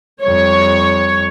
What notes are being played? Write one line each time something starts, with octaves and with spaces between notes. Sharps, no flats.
F2 G3 C#5